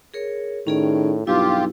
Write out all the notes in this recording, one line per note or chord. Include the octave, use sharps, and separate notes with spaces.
G#4 A#4 C#5
A2 D#3 C#4 G#4 D5
B1 G2 E4 F4 G4